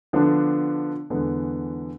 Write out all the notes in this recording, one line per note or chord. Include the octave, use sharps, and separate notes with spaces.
D3 F3 B3 D4
E2 D3 G#3 B3